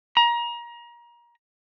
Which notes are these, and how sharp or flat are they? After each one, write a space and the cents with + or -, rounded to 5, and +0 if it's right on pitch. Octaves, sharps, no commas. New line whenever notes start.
A#5 +30